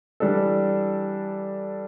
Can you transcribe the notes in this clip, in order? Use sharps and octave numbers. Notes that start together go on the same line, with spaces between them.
E3 G3 D4 A4